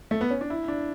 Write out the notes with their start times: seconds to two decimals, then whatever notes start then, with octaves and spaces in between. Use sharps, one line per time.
0.11 A3
0.21 B3
0.30 C#4
0.41 D4
0.50 E4
0.68 D4